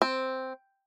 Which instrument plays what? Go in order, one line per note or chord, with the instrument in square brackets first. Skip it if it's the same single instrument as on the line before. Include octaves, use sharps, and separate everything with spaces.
[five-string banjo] C4